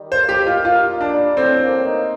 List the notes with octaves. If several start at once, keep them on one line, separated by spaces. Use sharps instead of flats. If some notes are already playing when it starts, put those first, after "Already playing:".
Already playing: D#3 G3
C5
A#3
G4
D#4
F4
A#3 F4
D#4
D4
G3
A2 C4
A#3
D#4